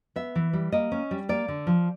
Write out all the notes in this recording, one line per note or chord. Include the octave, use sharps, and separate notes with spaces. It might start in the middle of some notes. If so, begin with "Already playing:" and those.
B3 E5
E3
G3
A#3 D#5
C#4
G3
A#3 D5
D3
F3